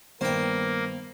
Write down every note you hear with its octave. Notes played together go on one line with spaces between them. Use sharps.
G2 D#3 A#3 B3 C5 G5